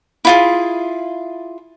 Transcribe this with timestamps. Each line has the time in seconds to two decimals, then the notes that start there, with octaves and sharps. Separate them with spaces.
0.25 E4 F4 G#4